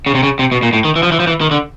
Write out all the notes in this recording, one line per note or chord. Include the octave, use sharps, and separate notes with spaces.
C#3
C3
C#3
C3
B2
A#2
A2
D#3
E3
F3
E3
F3
E3
D#3
D3